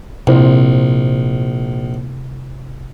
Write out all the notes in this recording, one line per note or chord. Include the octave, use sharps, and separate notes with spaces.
A#1 C3 E4 C5